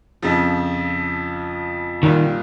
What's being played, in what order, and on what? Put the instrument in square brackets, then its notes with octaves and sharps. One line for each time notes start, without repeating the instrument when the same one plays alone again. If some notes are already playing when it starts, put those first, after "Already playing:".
[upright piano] F2 C#3 F3
[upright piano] C2 A#2 G3 C4 F4 [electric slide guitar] D#3